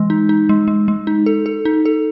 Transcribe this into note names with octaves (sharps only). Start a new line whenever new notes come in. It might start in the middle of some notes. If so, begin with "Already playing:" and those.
Already playing: E3 G#3
D#4
D#4
G#3
G#3
G#3
D#4
A4
A4
D#4
A4